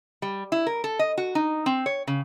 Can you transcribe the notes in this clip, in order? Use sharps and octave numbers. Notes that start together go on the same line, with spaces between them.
G3
E4
A#4
A4
D#5
F#4
D#4
C4
C#5
C#3